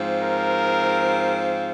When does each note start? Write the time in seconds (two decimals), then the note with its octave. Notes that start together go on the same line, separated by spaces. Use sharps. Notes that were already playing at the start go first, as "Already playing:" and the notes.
Already playing: G#2 F3 C4
0.21 A#4